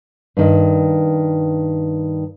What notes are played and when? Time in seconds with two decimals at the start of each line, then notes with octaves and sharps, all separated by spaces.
0.37 G2 D#3